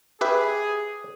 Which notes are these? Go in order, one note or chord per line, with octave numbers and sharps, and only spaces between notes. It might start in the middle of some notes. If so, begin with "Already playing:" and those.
G4 G#4 B4 E5